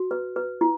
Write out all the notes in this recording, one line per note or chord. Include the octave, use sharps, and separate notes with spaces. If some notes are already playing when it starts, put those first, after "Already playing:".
Already playing: F#4
B4
B4
E4